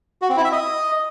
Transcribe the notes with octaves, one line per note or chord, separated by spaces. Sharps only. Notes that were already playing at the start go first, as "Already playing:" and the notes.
F#4
C4
E4
E5
D#5